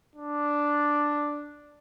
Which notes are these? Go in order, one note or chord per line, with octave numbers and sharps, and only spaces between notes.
D4